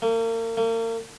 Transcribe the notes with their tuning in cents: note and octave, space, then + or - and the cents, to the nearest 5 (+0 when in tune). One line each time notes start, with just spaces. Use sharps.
A#3 -40
A#3 -40